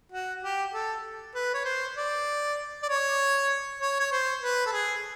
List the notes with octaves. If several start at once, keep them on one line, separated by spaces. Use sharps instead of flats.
F#4
G4
A4
B4
C#5
C5
D5
D5
C#5
C#5
C#5
C5
B4
A4
G#4